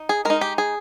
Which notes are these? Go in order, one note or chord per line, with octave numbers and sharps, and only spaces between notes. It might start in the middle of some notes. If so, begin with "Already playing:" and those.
Already playing: D#4
G#4
G#3 D#4 A#4
G4
G#4